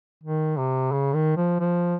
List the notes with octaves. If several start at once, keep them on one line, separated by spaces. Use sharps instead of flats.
D#3
C3
C#3
D#3
F3
F3